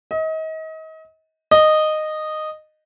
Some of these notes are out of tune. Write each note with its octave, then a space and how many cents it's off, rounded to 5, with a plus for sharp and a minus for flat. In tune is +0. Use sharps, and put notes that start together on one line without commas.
D#5 +35
D#5 -10